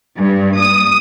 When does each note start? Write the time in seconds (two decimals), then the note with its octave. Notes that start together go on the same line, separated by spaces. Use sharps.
0.17 G2
0.59 D#6